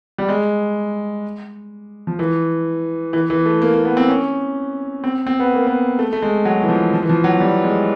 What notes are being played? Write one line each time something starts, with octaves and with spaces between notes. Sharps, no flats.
G3
G#3
F3
E3
E3
E3
A3
A#3
A#3
B3
C4
C#4
C4
C4
B3
A#3
B3
A3
A3
G#3
F#3
E3
F3
F3
E3
F3
F#3
G3
G#3